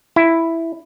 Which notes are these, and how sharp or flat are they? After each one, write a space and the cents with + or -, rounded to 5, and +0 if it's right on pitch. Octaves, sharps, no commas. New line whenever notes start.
E4 +5